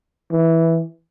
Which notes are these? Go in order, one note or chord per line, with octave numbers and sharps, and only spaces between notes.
E3